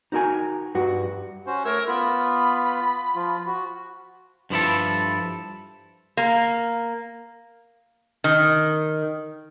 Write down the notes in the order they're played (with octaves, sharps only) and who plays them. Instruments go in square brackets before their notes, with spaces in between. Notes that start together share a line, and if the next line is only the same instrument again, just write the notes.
[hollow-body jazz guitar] D#4 F#4 A#4 G#5
G2 F#4
[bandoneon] C#4 F#4 C5
[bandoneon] A3 C#5 E6 [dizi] A#4
[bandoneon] B3 F4 [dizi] B5
[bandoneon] F3 F4
F#4
[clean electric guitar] G2 F3 E4 A4
[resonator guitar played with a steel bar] A#3
D#3